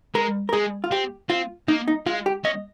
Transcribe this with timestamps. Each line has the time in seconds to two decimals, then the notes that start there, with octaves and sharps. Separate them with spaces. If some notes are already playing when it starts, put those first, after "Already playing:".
0.15 G#3 A#4
0.49 A#4
0.53 G#3 G#4
0.84 F4
0.91 C4 G4
1.30 C4 F4
1.68 A#3 D#4
1.88 D#4
2.06 G#3 F4
2.26 G4
2.44 C#4 D#5